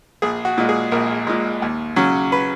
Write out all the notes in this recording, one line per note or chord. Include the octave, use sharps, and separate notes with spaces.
A#1 G#4
F#4
A#2 G#3
G#4
A#1 A#4
A#2 G#3
D#2
C#3 F#3 C#4
B4